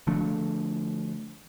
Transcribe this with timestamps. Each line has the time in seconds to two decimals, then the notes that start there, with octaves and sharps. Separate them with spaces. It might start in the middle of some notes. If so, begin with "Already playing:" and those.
0.07 D3 F3 A3 D4